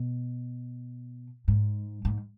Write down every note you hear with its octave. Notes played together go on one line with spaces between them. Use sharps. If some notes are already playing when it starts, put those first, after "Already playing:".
Already playing: B2
G#2
G#2